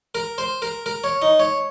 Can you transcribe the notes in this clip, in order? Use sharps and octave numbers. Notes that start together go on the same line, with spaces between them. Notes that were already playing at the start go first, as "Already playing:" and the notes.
A#4
C5
A#4
A#4
C#5
D#4
C#5